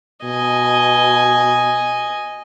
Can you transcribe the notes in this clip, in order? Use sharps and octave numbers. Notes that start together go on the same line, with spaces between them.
B2 D#5 G#5